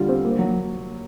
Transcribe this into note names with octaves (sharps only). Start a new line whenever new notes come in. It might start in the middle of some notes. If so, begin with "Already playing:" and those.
Already playing: D3 G3 F4
C4
A#3
F#3